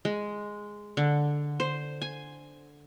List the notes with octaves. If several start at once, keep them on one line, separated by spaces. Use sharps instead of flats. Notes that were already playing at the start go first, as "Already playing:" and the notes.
G#3
D3
C5
G#5